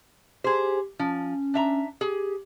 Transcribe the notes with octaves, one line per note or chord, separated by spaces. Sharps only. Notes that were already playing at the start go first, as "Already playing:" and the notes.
G4 G#4 C5
F3 C#4
D4 E5 A#5
G4 G#4